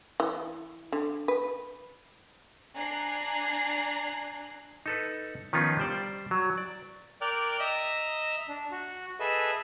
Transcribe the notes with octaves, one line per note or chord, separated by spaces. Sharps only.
E3
D3
B4
D4 G#5 A#5 F#6 C7
D#4 A4 B4
D#3 F3 B3 C#4 D#4 F4
G3 C5 D5
F#3
D5
A#4 D5 G5 D6 F6 F#6
D#5 E5 A#5
D4
F#4
G#4 A4 B4 D#5 E5